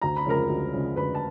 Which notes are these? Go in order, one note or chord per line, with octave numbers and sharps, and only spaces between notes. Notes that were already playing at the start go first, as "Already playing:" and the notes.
D2 A#5
B5
C#3 F3 G#3 A#4 A#5
D2
C#3 F3 G#3
D2 B4 B5
A5